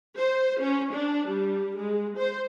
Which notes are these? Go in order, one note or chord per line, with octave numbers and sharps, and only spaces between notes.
C5
C#4
D4
G3
G#3
C5